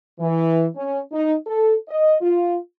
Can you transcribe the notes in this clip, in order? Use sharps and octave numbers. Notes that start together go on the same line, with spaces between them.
E3
C#4
D#4
A4
D#5
F4